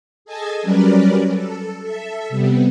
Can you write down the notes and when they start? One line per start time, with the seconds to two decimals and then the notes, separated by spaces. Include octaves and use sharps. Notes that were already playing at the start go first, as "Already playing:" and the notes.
0.25 G#4 A4 D#5 G#5 A5
0.62 F#3 G3 C#4 A#4 B4 D5
1.32 A4
1.81 A4 E5
2.29 C3 G3 B3